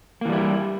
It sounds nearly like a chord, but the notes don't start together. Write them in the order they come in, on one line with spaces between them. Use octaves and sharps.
A#3 E3 G3 E4